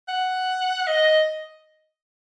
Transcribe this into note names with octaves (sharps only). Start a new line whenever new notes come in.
F#5
D#5